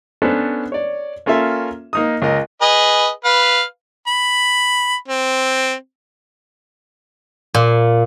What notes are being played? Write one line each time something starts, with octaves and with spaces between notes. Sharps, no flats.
B3 C#4 D4 A4 B4 C5
C#5 D5
A#3 C#4 F4 A4 E5
A#3 D#4 D#6
C#2 A#4 D#5
G#4 B4 D#5
B4 F5
B5
C4
A#2